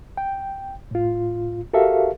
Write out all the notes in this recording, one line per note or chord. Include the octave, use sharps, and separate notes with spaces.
G5
A2 F4
F#4 G4 A4 A#4 E5 F5